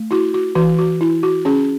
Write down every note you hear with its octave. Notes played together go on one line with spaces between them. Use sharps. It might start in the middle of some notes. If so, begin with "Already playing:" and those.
Already playing: A3
E4 F#4
F#4
E3 F#4
F#4
E4
F#4
C#4 G#4